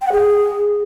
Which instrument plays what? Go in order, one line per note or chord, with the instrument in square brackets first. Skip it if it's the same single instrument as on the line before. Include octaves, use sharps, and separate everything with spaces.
[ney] G5
F#5
G#4